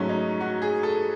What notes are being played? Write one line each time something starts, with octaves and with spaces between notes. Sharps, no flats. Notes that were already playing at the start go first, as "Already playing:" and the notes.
Already playing: G#2 F#3 A3 C#4
D#4
F#4
G#4
A4